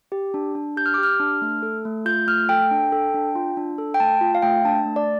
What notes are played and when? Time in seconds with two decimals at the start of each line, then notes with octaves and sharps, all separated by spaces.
0.12 G4
0.34 D4
0.55 D4
0.77 G4 G6
0.86 F6
0.94 D6
0.98 G4
1.03 F6
1.20 D4
1.42 A3
1.62 A4
1.85 A3
2.05 F4 G6
2.27 A3 F6
2.49 A4 G5
2.71 D4
2.92 A4
3.14 D4
3.35 F4
3.57 D4
3.78 A4
3.94 G5
4.00 A3 A5
4.21 F4
4.35 F5
4.42 A3 G5
4.65 D4 A5
4.86 A3
4.96 D5